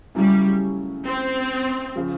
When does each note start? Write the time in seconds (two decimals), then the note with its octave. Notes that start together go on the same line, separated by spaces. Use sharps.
0.15 C#3 F#3 G3 A3 C#4 E4
1.06 C4
1.96 C#3 F3